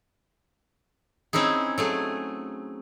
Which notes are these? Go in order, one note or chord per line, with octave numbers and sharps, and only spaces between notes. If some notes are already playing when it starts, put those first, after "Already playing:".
C4 C#4 D#4 E4 G#4
F#3 A3 G#4